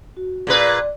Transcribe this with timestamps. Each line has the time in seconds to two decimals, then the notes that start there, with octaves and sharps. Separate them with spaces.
0.17 F#4
0.47 A#2 G#4 B4 D5